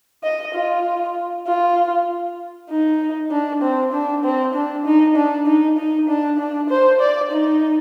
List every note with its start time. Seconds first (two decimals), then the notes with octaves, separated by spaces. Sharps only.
0.23 D#5
0.54 F4
1.47 F4
2.70 D#4
3.31 D4
3.62 C4
3.92 D4
4.24 C4
4.54 D4
4.85 D#4
5.16 D4
5.46 D#4
5.77 D#4
6.08 D4
6.39 D4
6.70 C5
7.00 D5
7.31 D#4